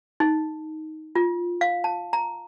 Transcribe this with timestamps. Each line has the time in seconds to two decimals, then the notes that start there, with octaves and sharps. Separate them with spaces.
0.20 D#4
1.15 F4
1.61 F5
1.84 A5
2.13 A#5